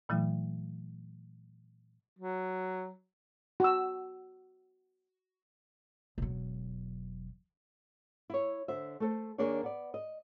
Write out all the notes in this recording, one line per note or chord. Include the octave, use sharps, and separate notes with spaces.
A#2 E3 F#3 A3 E4
F#3
F#4 E6
E1 F#3
E4 C#5
D3 C5 E5
A3 A4 C5
D#2 A#3 D4 G#4 C#5
B3 D5
D#5